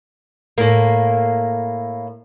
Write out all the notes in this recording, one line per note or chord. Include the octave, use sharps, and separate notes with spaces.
A2 A#3